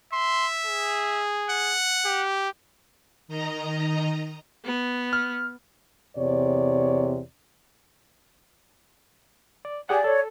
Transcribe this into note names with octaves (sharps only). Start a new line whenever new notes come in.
E5 C6
G#4
F#5
G4
D#3 D#5 A#5
B3
F6
E2 C3 C#5 D5
D5
G4 G#4 D5 F#5 G#5
A4 C#5